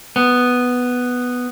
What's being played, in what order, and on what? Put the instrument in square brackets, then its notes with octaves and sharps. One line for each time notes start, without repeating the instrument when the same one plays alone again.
[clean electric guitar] B3